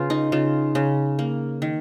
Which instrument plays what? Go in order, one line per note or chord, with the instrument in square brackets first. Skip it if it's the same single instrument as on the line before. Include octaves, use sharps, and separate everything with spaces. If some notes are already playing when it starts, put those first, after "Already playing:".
Already playing: [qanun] C#3 B3 F4
D#4
C#3 F4
C#3
A#3
D#3